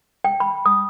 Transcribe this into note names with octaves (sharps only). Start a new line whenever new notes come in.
G5
B5
D#6